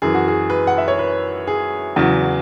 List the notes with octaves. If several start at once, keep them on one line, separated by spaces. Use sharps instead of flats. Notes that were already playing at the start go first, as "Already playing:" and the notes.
F#2 E3 G#4
F#4
G#4
B4
F#5
E5
C#5
B4
G#4
E2 C#3 F#3